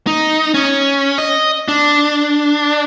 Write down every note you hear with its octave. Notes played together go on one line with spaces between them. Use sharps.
D#4
C#4
D#5
D4